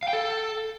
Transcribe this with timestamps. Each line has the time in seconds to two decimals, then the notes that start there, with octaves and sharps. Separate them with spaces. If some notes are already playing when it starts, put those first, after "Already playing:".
0.03 F5
0.08 G5
0.13 A4